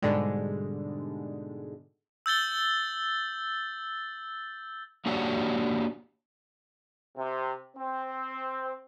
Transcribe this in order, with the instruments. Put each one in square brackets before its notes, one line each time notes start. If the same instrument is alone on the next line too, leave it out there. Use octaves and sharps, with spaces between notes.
[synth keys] G#2 B2 D3 G3 G#3
[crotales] E6 G6 A6 G7
[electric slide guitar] A#3 D4 F#4 G4 C#5 F#5
[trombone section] C3
C4